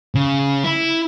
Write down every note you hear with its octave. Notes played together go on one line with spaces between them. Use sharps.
C#3
E4